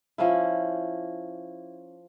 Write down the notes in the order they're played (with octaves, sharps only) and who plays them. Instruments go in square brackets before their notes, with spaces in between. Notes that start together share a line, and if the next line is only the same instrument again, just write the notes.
[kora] F3 C#4 E4